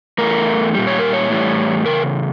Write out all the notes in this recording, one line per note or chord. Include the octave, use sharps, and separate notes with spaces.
E2 E3 A3 A#4
A#2 G3
C#5
A#4
C#5
A2 E3 G3
E2 C#3 A#4